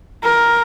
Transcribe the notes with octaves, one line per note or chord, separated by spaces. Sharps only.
A#4